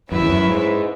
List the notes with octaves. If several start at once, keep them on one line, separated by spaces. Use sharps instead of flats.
F#2 C#4 E4 B4 E5
E2
F#2
G#2